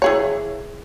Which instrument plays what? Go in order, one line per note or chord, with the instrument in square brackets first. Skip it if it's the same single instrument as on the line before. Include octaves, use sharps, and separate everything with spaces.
[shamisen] E3 G#4 C#5